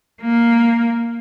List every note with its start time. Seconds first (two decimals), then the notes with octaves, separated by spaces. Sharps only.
0.21 A#3